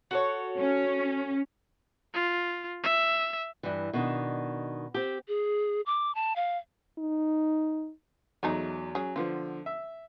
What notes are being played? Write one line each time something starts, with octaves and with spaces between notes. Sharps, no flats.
F#4 A4 C#5
C#4
F4
E5
G2 E3
B2 D#3 D4
C4 G4
G#4
D6
A5
F5
D#4
E2 F#3 G#3 A3 D#4
F#3 C#4 G#4
D3 F3 B3 F4
E5